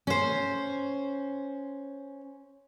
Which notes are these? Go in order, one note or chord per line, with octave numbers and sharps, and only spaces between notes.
C#4 C5